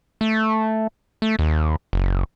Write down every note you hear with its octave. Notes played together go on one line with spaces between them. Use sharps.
A3
A3
D#2
F#1